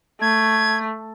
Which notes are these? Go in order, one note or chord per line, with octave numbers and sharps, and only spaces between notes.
A3 G#6